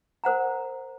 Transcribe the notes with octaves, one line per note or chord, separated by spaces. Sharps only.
A#4 C5 F#5 A#5